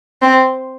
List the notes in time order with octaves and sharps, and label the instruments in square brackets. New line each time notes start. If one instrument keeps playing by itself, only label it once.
[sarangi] C4